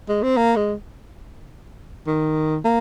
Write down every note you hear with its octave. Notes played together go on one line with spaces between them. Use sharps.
G#3
C4
A#3
G#3
D#3
A#3